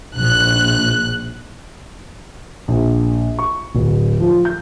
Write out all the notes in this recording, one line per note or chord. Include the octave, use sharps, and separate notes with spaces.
A#1 F#6
A#1
C#6
D1
F3
G6